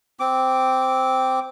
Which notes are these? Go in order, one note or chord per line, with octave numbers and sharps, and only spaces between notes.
C4 D6